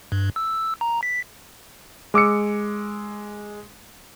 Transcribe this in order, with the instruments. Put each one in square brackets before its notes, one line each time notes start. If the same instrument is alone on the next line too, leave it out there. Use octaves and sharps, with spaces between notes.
[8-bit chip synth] G2
E6
A#5
B6
[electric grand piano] G#3 D6 E6 C#7